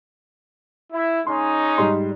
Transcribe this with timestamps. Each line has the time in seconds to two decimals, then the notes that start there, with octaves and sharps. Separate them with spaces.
0.93 E4
1.27 G#3 C#4 D#4 C6
1.78 G#2 G3 C6